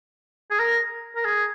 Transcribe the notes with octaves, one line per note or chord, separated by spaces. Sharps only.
G#4
A#4
A#4
G#4